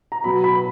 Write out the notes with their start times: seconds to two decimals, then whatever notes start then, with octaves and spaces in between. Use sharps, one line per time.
0.12 A#5
0.24 B2 F#3 B5
0.44 B5